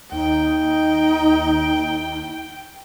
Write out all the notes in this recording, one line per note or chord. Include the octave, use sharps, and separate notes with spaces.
D#2 D#4 G5